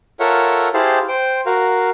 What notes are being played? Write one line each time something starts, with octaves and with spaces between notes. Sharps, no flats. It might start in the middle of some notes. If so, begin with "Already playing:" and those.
F4 A4 A#4 C#5 E5 F#5
E4 G4 G#4 C5 F5 A5
C5 G5
F#4 A#4 F5